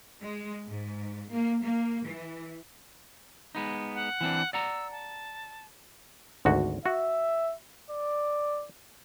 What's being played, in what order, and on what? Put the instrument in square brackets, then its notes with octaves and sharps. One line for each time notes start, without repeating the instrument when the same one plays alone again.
[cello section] G#3
G#2
A#3
A#3
E3
[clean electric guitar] G#3 B3 D#4
[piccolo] F#5
[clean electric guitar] E3 C4 D4
[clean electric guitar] D5 F#5 A#5 [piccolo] E6
[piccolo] A5
[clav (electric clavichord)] G#1 D2 F#4
[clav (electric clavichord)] F#4 [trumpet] E5
[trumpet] D5